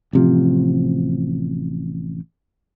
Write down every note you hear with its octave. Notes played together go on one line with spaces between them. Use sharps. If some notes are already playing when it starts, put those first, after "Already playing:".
A1 C3 F3